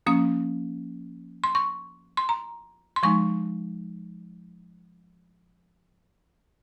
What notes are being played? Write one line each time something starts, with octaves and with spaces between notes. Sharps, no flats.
F3 A#3 C#4 D#6
C6
C#6
C6
A#5
C6
F3 G#3 D#4 C#6